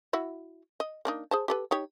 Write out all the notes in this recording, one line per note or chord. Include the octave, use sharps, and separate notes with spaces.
E4 F#4 E5
D#5
A#3 D4 D#4
G#4 C5 A5
G4 A4 B4
D#4 G4 C#5